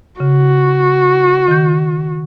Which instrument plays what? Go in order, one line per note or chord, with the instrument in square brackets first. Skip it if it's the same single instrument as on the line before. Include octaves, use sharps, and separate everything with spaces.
[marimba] C#3 [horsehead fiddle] F#4
[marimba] D#3 G6